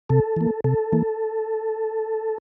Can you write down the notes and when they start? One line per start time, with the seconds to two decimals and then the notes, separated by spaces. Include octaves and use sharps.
0.09 C3 A4
0.37 E3 A#3
0.64 C3 A4
0.92 E3 A#3